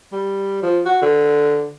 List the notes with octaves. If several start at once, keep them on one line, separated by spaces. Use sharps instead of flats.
G3
F3
F#4
D3